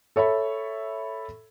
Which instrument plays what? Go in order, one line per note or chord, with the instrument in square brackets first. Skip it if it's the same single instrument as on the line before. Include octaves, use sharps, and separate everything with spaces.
[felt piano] A4 C#5 E5 B5